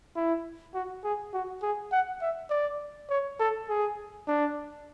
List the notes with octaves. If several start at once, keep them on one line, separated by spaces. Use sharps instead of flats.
E4
F#4
G#4
F#4
G#4
F#5
E5
D5
C#5
A4
G#4
D4